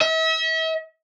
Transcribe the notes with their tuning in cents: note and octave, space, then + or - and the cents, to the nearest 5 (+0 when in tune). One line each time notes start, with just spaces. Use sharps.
E5 -40